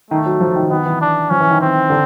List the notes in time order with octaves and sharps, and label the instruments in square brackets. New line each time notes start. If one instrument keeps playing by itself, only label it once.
[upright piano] D#3 [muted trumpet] A3
[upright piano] F#3
F3
D#3
[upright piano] D#3 [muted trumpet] B3
[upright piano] E3
[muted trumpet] D4
[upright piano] F3 [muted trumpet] C#4
[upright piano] E3
D#3
[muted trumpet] C4
[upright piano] D3